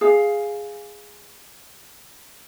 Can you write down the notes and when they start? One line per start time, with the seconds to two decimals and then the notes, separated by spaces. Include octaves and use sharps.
0.01 G#4 F5